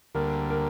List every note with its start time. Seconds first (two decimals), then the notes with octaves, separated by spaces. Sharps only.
0.15 D2 D3 G3 A#3 A#4
0.50 A#4